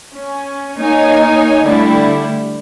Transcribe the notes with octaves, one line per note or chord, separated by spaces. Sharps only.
C#4
A#3 D#4 C#5 G#5
D3 G3 A3 E4